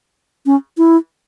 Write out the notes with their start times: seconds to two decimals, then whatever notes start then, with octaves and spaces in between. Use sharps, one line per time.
0.46 C#4
0.78 E4